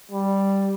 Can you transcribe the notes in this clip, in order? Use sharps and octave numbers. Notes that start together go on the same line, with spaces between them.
G3